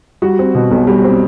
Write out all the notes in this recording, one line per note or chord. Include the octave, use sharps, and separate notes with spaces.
G3 F#4
C4
B2
B1
G3
C4